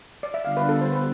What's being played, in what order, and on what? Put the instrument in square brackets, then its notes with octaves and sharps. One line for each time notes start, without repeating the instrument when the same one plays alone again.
[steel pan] D5
E5
[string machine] D3 G3 B3 D4 F4 [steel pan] F5
[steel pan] B4
A4
C5
B4